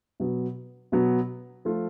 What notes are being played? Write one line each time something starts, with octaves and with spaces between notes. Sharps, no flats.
B2 F#3 B3
B2 F#3 B3
F3 A3 F4